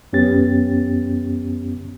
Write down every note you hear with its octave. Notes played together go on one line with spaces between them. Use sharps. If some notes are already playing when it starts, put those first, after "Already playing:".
F#2 B3 C#4 G4 A6